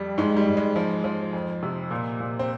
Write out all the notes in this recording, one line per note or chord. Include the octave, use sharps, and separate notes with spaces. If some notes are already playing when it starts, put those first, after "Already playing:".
Already playing: F2 G3
G#2 G#3
G3
G#2
G#3
F3
F3
F2
C3
A#2
A#2
C4